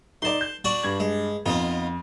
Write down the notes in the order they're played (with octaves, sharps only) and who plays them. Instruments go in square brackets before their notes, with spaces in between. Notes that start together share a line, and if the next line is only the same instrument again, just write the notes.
[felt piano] D#4 D5 [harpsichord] A5 C6
[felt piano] G6
[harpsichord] D4 F#4 D5
[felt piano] G2 G#6
[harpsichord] G#3
[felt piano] F2 [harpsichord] B3 D#4 F4